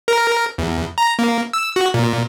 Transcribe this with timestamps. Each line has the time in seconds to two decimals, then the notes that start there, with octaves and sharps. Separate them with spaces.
0.08 A#4
0.58 E2
0.98 A#5
1.19 A#3
1.53 E6
1.76 F#4
1.94 A#2